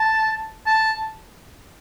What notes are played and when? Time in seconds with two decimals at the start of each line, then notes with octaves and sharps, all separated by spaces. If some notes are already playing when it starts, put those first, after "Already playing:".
Already playing: A5
0.66 A5